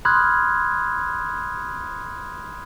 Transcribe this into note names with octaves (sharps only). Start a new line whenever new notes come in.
B5 C6 D#6 F6 F#6 G#6